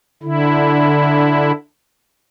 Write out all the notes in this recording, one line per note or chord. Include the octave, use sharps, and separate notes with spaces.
D3 E4